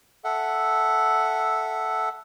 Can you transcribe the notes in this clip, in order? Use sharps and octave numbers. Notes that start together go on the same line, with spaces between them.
A4 E5 F#5